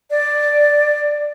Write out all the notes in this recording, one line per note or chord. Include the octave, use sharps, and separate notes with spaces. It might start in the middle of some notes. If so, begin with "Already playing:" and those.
D5